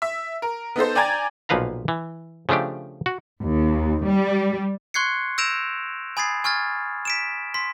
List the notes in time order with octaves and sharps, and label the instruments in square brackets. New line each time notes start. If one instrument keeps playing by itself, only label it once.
[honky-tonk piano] E5
A#4
B3 D#4 A4 C5
D5 G5 G#5 A#5 G#6 A6
[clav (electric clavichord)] B1 A#2 F3 B4 F5 A#5
E3
C#3 F3 A3 D4 G4
F#4
[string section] D#2
G3
[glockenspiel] C6 C#6 F#6 G#6 C7 C#7
E6 G6 A#6 D7 E7 F7
G#5 B5 D#6 G#6 A6 C7
G#5 C#6 F6 G#6 A6
B6 D7 E7
C6 B6